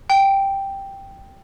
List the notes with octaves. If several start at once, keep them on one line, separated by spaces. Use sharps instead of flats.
G5